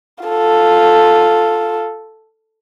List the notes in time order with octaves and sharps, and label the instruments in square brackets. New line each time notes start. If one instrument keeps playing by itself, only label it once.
[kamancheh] F4 A4